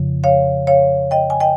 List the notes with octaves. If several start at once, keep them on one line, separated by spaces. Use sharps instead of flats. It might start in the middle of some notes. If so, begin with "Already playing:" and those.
Already playing: F2 C#3 F3
C#5 F5
C#5 F5
D#5 G5
G#5
D#5 G5